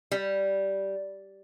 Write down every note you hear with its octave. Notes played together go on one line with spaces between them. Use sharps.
G3